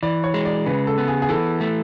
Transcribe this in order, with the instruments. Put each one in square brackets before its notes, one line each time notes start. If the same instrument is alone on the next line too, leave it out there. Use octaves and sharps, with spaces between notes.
[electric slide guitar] E3 [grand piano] D5
[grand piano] C#5
[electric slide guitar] G#3
[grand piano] D5
[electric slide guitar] C#3 [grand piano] B4
[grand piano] A4
[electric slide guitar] B3
[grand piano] G#4
G#4
[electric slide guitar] E3 [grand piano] A4
[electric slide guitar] A3